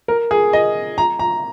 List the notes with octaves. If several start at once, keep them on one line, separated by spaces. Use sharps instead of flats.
A#4
G#4
D#5
A#5
A#5